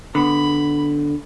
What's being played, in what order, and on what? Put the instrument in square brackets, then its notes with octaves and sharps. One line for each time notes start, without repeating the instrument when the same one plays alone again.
[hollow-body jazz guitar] D3 B3 [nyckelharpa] B5